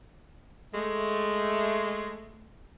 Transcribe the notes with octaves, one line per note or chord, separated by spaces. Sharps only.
G#3 A3